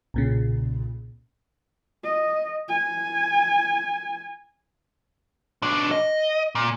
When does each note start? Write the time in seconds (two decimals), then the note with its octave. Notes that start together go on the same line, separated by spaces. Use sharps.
0.14 B1 A#2 C#3
2.04 D#5
2.68 G#5
5.62 B2 D4
5.91 D#5
6.55 A#2